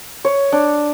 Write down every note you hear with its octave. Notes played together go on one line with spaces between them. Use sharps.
C#5
D4